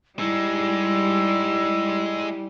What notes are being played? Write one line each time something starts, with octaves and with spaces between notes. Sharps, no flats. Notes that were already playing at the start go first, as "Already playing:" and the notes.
G3 G#3 D#4 E4 E6